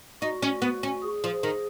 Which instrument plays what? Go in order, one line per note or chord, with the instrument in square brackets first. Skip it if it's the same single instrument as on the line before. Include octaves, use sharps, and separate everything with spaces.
[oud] D#4 [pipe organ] F#4
[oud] C#4
B3
C#4
[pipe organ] G#4
[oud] F3
D#3